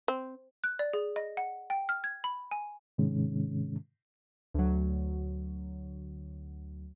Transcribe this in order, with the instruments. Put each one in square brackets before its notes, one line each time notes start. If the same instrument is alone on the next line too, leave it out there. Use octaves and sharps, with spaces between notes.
[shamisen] C4
[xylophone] F#6
D5
G#4
D#5
F#5
G5
F6
G#6
B5
G#5
[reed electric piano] G#2 C3 D#3 G#3 C#4
[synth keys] D2 F#3